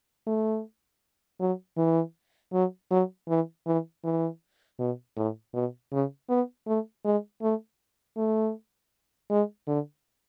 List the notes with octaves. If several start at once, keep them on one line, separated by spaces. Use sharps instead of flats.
A3
F#3
E3
F#3
F#3
E3
E3
E3
B2
A2
B2
C#3
B3
A3
G#3
A3
A3
G#3
D3